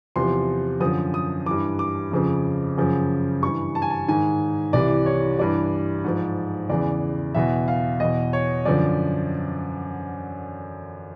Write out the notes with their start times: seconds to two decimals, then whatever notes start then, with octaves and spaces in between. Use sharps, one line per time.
0.16 E2 C3 F3 C6
0.80 F#2 D3 F3 D#6
1.14 D#6
1.46 G2 E3 D6
1.79 D6
2.11 F2 C#3 F3
2.77 F#2 C#3 F3
3.43 G2 E3 C#6
3.75 A5
3.82 G#5
3.90 A5
4.08 G#2 D#3 G#5
4.73 C2 C3 E3 D5
5.06 C#5
5.39 G2 E3 D5
6.04 G#2 F3
6.69 E2 C#3 E3 D5
7.35 E2 B2 E5
7.68 F5
8.00 E2 B2 D#5
8.33 C#5
8.65 F#2 D3 F3 D5